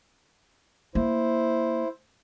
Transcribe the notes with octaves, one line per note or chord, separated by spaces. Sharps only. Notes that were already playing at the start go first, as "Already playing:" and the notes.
A#3 E4 C5